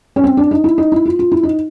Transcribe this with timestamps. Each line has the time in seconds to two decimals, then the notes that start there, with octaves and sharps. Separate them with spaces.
0.16 C#4
0.24 C4
0.37 D4
0.51 D#4
0.64 E4
0.78 D#4
0.92 E4
1.05 F4
1.19 F4
1.32 E4
1.43 D#4